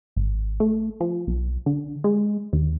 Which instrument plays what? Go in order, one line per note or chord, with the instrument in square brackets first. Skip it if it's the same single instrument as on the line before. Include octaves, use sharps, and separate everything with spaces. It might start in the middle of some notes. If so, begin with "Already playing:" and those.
[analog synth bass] G#1
A3
F3
B1
D3
G#3
D#2